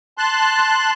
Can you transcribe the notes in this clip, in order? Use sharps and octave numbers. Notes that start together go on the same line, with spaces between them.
A5 C6 F#6